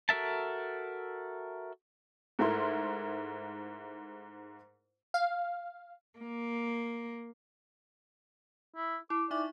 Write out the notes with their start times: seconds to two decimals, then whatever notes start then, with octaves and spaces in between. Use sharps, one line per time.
0.09 F#4 A4 A#4 E5 A5
2.39 G#2 A3 E4 A#4 C6
5.14 F5
6.19 A#3
8.76 E4
9.10 E4 D6
9.31 D#4 D5 E5 C#6